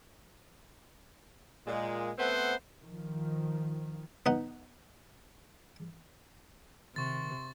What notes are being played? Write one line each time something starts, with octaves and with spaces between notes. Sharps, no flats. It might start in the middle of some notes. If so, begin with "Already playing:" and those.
A#2 G#3
A3 B3 C4 B4 C5 F#5
D#3 F3
B3 D#4 F#5
C3 D#3 C6 C#6 A6